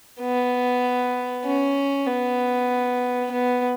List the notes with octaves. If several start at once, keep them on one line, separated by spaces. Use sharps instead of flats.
B3
C#4
B3
B3